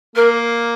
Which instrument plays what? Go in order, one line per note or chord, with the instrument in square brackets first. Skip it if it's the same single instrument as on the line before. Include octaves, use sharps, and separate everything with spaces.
[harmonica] A#3 [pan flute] A#4